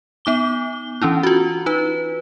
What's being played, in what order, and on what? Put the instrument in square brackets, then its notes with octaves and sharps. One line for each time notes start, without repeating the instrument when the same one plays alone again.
[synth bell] B3 D#4 D6 G7
E3 C#4 D4 E4
F4 F#4
D#4 B4